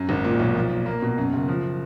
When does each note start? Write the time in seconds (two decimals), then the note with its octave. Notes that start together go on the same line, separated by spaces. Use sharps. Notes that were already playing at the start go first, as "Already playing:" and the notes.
Already playing: F#2
0.09 G#1
0.24 A#2
0.40 B1
0.55 F3
0.70 A#2
0.86 A#3
1.02 B2
1.18 F#2
1.33 F#1
1.48 F3